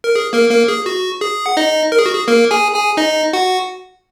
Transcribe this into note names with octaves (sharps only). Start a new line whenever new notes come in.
A#4
G#4
A#3 A#4
A#3 A#4
G#4
F#4
G#4
F#5
D#4 D#5
A#4
G#4
F#4
G#4
A#3 A#4
G#4 G#5
G#4 G#5
D#4 D#5
F#4 F#5